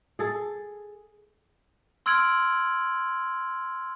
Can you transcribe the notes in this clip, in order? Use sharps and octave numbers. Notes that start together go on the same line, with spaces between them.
G#4 A4
C6 E6 F6 G#6 D7 F#7